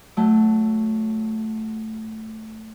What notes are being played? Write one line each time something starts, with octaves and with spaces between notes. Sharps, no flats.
F#3 A3